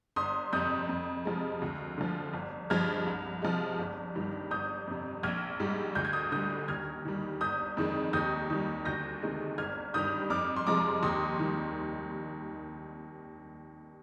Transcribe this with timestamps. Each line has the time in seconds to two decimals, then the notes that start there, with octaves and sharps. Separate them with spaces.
0.16 G1 C6 D#6
0.53 F2 C3 D#6 G6
0.89 F2
1.25 C3 F3 G#3
1.62 D2
1.98 D3 F3
2.34 G1
2.70 G2 F3 G#3 F6 G#6
3.06 C2
3.42 C3 F3 G#3
3.79 G1
4.15 G2 D#3 G3
4.51 G1 D#6 G6
4.87 F2 C3
5.23 A#1 F6 G#6
5.60 G#2 G3
5.95 D2 G6
6.05 G#6
6.13 D#6 G6
6.32 D3 G3 D#6 G6
6.68 D#2 F6 G#6
7.05 D#3 G3
7.41 G1 D#6 G6
7.77 F2 D#3 G#3
8.13 D#2 D#6 G6
8.50 D#3 G3
8.85 D2 G6 A#6
9.22 C3 D#3 G#3
9.58 G1 F6 G#6
9.94 G2 D#3 G3 D#6 G6
10.30 F2 D6 F6
10.56 C6
10.67 C3 F3 G#3 A#5 D6
11.03 D#2 C6 D#6
11.39 D#3 G3